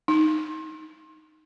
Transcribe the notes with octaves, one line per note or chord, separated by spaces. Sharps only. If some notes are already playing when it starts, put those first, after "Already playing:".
D#4